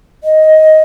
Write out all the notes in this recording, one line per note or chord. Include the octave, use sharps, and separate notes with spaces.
D#5